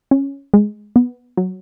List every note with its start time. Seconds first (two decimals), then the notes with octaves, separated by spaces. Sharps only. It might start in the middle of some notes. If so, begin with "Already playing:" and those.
0.11 C#4
0.54 G#3
0.96 B3
1.37 F#3